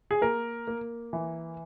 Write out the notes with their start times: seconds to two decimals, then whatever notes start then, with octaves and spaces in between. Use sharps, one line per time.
0.11 G#4
0.21 A#3 A#4
0.67 A#3
1.13 E3